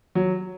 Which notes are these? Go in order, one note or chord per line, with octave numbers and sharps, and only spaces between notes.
F#3